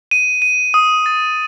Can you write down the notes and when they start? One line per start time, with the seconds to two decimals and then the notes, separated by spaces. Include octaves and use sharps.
0.11 D#7
0.42 D#7
0.74 D#6
1.06 A6